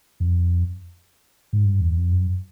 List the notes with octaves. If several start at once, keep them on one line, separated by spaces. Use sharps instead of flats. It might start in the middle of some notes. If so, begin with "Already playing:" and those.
F2
G#2
G2
E2
F2
F#2